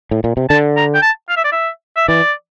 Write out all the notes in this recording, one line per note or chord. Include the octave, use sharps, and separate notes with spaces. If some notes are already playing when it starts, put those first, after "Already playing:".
A2
A#2
C3
D3 A5
A#5
G5
A5
F5
E5
D5
E5
E5
E3 D5